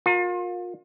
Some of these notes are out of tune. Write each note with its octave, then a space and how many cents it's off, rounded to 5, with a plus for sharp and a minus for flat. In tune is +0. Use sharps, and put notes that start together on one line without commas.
F4 +35 A#4 +0